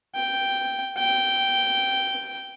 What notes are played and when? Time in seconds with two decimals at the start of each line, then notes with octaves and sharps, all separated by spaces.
0.16 G5
0.98 G5